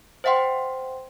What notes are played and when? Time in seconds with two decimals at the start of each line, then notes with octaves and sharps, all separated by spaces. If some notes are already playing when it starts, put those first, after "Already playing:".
0.24 C5 E5 F#5 G5 C6